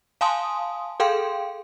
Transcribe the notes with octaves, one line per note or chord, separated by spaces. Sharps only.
F5 G#5 A5 C6 D#6
G#4 A4 F5 G5 C6